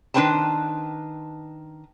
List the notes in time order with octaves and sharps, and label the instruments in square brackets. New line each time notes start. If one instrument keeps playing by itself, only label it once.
[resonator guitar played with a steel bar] D#3 D4 B4 C5 G5 A5